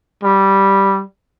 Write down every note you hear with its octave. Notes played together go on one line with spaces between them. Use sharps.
G3